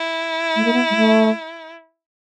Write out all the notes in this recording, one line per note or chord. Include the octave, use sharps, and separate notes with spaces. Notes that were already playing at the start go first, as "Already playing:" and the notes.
Already playing: E4
A3
A#3
B3
G#3
A3